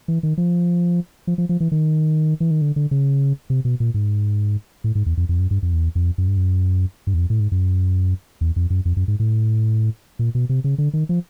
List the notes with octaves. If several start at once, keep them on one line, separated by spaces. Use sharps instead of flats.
E3
D#3
F3
F3
F3
F3
E3
D#3
E3
D#3
D3
D3
C#3
C3
B2
A#2
G#2
A2
G#2
E2
F2
F2
F#2
G2
F2
E2
F2
F#2
G2
F#2
G2
E2
F2
A2
G#2
F#2
E2
F2
F#2
F2
F#2
G#2
A2
A#2
B2
C3
C#3
D3
D#3
F3